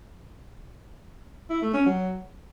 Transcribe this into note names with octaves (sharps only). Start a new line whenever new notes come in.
E4
A3
C#4
F#3